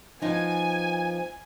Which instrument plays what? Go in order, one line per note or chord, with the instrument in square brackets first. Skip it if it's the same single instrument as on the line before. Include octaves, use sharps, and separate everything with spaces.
[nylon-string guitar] F3 B3 D#4 [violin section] G#5